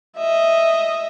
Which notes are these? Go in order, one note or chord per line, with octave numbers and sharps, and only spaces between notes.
D#5 E5